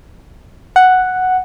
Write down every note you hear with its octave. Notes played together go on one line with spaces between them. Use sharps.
F#5